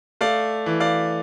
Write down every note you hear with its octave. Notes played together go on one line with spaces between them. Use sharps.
A3 D5 F5
E3
D5 F5